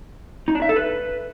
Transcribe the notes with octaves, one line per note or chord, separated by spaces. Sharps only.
D#4
D4
E5
A4
B4